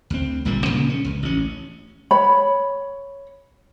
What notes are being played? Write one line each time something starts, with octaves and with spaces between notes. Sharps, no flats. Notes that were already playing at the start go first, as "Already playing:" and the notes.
D2 C4
G#1 A#2 G3 A#3
A#2 C#3 F3 G#3
C#4
C#2
A1 C#4
C#5 B5